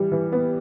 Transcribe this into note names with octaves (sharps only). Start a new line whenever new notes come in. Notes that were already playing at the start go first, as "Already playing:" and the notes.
Already playing: E3 G3
E3
B3